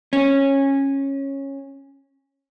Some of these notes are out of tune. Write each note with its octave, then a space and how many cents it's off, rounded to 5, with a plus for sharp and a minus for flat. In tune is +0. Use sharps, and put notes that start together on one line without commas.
C#4 -15